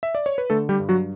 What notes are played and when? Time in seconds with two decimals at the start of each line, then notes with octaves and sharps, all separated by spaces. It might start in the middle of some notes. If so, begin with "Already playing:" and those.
0.03 E5
0.15 D5
0.26 C#5
0.38 B4
0.50 D3 A3 A4
0.69 G3 G4
0.80 G2
0.89 F#3 F#4